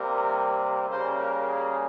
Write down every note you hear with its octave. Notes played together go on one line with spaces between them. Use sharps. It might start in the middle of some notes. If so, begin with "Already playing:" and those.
Already playing: C3 G3 A#3 A#4
C#3 G3 A#3 C5
A#4
G#4